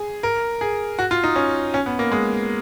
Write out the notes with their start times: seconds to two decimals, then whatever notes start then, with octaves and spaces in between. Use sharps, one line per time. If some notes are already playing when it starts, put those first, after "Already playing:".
Already playing: G#4
0.23 A#4
0.61 G#4
0.99 F#4
1.11 F4
1.24 D#4
1.36 C#4
1.74 C#4
1.86 B3
1.99 A#3
2.12 G#3